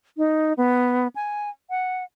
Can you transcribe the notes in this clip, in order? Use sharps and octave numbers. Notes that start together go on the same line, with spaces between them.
D#4
B3
G#5
F#5